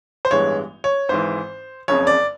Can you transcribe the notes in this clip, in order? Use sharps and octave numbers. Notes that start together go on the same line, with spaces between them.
C5
A1 G2 E3 G#3 B3 C#5
C#5
G#1 G#2 E3 C5
F#1 F2 C#3 C#5
D5